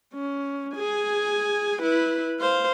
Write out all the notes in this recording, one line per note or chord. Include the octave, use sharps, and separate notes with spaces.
C#4
G#4 G#5
E4 B4
C5 F5